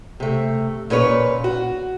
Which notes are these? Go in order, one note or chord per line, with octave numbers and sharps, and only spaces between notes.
C3 A3
A#2 C#4 B4 C#5
F#4